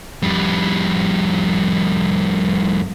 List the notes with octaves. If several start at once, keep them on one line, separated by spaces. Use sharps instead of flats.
F2 G3